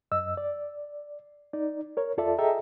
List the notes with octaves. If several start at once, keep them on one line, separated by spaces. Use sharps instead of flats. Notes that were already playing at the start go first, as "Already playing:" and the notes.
F#2 D#5 E6
D5
D#4 D5
A#4 C#5
E2 F4 A4 D5 E5 A5
G#4 A4 D#5 E5 G5 A#5